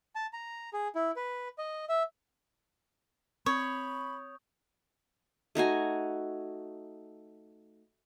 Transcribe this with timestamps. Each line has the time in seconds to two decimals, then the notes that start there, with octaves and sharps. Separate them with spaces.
0.15 A5
0.33 A#5
0.73 G#4
0.95 E4
1.16 B4
1.58 D#5
1.89 E5
3.46 C4 C#5 B5 C#6 D#6 G6
5.55 A3 D#4 F#4 G#5